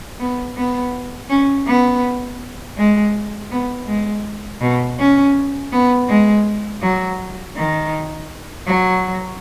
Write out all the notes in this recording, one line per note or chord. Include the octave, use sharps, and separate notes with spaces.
B3
B3
C#4
B3
G#3
B3
G#3
B2
C#4
B3
G#3
F#3
D#3
F#3